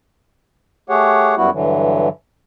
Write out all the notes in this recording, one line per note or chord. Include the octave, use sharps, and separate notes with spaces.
A3 G4 G#4 C#5 F#5
F#2 G3 B3 E4 F#4
G2 D3 E3 F#3